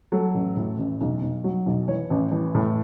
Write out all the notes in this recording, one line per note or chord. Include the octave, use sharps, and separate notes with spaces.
F#3 A4
A1
A2
A1
B1
B1
F#3
B1
E3 C#5
A1
E3
A2